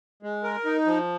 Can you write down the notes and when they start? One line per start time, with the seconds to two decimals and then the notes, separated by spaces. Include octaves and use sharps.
0.23 G#3
0.43 A#4
0.65 D#4
0.86 F3